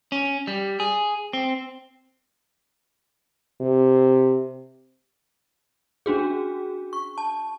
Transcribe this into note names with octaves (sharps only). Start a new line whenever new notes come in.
C#4
G3
G#4
C4
C3
C#4 D4 F#4 G#4
C#6
A5